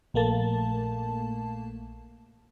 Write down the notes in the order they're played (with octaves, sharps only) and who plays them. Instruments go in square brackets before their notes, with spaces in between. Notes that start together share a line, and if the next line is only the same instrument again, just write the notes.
[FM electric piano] A#1 A3 A#3 A5